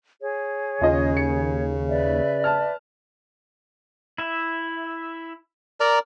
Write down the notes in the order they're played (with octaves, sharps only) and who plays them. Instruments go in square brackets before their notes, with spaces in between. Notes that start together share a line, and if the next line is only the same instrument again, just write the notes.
[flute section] G#4 C#5
[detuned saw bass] D#2 [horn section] C#3 [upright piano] F4 D#5
[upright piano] C#7
[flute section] B4 D5 E5
[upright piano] A5 F6
[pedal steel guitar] E4 E5
[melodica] A#4 D5 A#5